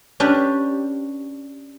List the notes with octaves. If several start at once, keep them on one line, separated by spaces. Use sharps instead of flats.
C#4 D4 G4 B4